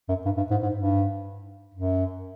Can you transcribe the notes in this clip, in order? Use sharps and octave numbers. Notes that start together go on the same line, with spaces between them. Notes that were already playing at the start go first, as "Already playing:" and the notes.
F#2
G2
G2
G#2
G#2
G2
F#2